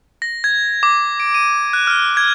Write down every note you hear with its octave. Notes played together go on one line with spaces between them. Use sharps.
A#6
G#6
D6
D7
D#7
F#6
F6
G#6